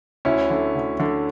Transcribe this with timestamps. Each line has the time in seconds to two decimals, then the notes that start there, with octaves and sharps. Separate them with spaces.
0.25 D2 C#4 E4
0.50 D3
0.75 D2
1.00 D3